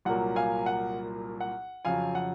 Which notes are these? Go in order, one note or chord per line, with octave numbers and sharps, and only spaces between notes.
C2 A#2 F#3 A#3 F#5
F5 G#5
F#5
F#5
F2 C#3 F#3 F5 G#5
F#5